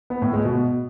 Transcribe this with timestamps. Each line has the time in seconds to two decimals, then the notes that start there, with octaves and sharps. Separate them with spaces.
0.10 B3
0.22 A2
0.33 G#3
0.45 B2